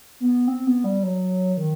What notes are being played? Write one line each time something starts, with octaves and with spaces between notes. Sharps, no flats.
B3
C4
B3
G3
F#3
D#3